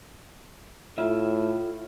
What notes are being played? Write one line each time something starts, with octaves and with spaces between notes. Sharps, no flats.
A2 F4 E5